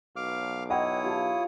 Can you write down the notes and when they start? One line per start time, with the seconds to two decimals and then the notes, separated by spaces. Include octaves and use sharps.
0.16 B1 F5 D6 F6
0.70 E4 C#5 D#5 F#5 G5 D#6
1.04 F4 G4 A5